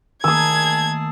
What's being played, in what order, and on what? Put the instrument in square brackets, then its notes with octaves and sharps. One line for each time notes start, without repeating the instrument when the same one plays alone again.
[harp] D#3 A3 A#3 [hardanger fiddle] G#4 A5 [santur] D#6 E6 [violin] G#6